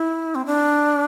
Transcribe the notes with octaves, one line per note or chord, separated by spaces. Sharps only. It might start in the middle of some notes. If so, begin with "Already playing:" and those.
Already playing: E4
C4
D4